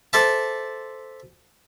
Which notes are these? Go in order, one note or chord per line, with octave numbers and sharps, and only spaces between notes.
A4 C5 D5 E5 A5